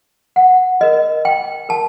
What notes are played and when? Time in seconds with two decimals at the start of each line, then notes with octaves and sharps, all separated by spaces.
0.36 F#5
0.80 F#4 A#4 D#5
1.25 G5
1.69 A#4 A5